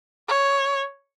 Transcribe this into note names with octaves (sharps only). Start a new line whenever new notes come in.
C#5